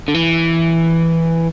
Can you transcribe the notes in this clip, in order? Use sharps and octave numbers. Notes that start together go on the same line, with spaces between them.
D3
E3